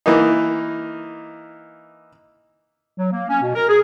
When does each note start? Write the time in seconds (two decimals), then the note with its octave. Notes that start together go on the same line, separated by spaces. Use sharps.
0.06 E3 A#3 D#4
2.98 F#3
3.12 A#3
3.29 C#4
3.42 B2
3.55 A#4
3.69 G#4